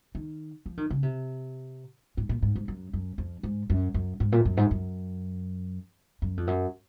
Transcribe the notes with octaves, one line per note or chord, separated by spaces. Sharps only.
D#3
F3
D#3
C#3
C3
G#2
A#2
G#2
G#2
F#2
F#2
F2
G#2
F#2
F#2
G#2
A#2
F#2
G#2
F#2
F#2
F2
F#2